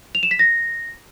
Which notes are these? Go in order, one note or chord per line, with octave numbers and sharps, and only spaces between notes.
F7
E7
B6
A#6